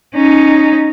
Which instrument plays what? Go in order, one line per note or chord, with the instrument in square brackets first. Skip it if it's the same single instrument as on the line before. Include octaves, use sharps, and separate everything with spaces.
[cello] C#4 D#4